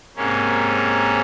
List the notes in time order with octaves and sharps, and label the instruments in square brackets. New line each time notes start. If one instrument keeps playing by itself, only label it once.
[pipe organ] G#2 C3 A#3 C#4